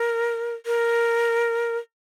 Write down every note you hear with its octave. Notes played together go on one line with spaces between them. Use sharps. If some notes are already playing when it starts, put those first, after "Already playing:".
Already playing: A#4
A#4